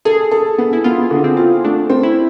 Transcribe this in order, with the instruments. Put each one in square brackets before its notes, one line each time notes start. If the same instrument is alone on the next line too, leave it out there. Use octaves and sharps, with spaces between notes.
[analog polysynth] G#4 [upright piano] A4
[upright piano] A4
B3
[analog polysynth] E4
[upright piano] B3 [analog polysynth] F4
[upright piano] D3
[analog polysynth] C4
[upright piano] F4
[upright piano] A3 [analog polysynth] D4
[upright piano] C4
[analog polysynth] E4